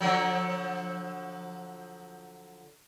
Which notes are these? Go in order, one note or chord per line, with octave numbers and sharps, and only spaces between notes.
D3 F3 F#3